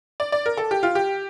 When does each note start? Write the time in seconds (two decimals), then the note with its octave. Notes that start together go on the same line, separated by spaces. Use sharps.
0.20 D5
0.32 D5
0.46 A#4
0.57 A4
0.71 G4
0.83 F4
0.95 G4